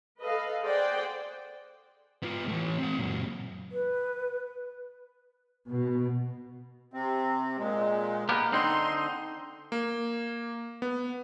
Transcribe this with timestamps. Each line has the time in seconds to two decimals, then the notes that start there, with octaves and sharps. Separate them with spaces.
0.21 A4 B4 D#5 F5
0.62 G#4 C5 D5 F#5 G5
2.23 B3 F4
2.48 E3 A3
2.79 C4 F#5
2.97 F#2 A#2
3.72 B4
5.71 B2
6.94 C3 C4
7.58 A#2 G#3
8.29 A#3 B3 G4
8.52 D3 C4 D#4 C6
9.72 A#3
10.82 B3